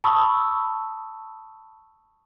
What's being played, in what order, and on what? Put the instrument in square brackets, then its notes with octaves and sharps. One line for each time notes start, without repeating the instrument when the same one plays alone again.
[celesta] A5 B5 C#6 D#6 E6